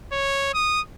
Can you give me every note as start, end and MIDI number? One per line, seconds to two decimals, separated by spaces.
0.12 0.51 73
0.54 0.81 87